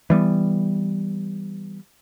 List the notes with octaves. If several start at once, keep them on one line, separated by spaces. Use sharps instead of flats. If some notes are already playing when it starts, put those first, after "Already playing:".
E3 G3 B3